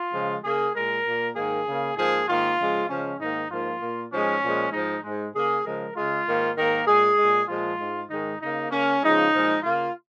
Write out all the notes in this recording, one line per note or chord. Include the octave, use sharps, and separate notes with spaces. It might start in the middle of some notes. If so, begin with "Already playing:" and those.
Already playing: F4
C#3 F3 G#3
C#3 A#3 G#4
A#2 G#3 A#4
A#2 A#3
G#2 D#3 A#3 G#4
C#3 A#3
G#2 F3 A#3 G#4
G#2 D#3 A#3 F4
C#3 F3 G#3
C#3 F3 G#3 C#4
G#2 D#3 A#3 D#4
G#2 F3 A#3 F4
A#2 A#3
G#2 F3 G#3 C#4
A#2 F3 G#3
G#2 F3 G#3 D#4
G#2 G#3
C#3 A#3 G#4
C#3 F3 G#3 A#4
C#3 G#3 F4
G#2 D#3 A#3
G#2 D#3 A#3 A#4
A#2 G#3 G#4
A#2 G#3
A#2 F3 G#3 F4
G#2 G#3
G#2 D#3 G#3 D#4
C#3 A#3 D#4
C#3 A#3 C#4
C#3 F3 G#3 D#4
A#2 F3 G#3
C#3 A#3 F4